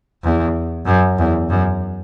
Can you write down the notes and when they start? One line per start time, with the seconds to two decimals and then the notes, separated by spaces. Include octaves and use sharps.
0.23 E2
0.86 F#2
1.18 E2
1.50 F#2